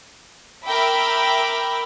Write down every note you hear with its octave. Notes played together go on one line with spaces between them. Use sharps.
A#4 E5 G5 B5 D6